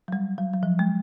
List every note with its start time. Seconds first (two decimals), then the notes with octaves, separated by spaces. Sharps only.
0.08 F#3
0.13 G3
0.38 F#3
0.53 F#3
0.63 F3
0.79 G#3